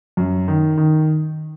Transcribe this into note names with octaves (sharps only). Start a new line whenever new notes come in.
F#2
D#3
D#3